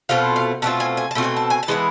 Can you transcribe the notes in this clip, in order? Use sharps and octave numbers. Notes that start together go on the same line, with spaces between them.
B2 A3 C4 F4 F5
F5
B2 A3 C4 F4 A5
G#5
G#5
A5
B2 A3 C4 F4
G#5
A5
G#5
A5
E3 G#3 B3 E4